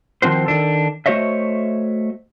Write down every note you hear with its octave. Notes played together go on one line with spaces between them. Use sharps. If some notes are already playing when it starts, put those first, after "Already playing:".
D#3 F3 C4 F#4 C5
D#3 D4 A4
A3 F#4 C5 C#5 D#5 E5